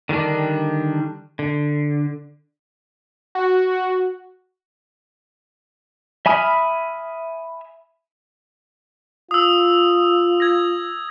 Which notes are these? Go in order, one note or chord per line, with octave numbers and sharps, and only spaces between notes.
D3 D#3 G3 D4
D3
F#4
E5 G#5 B5 D#6 F6
F4 D#6 E6
G#6 A#6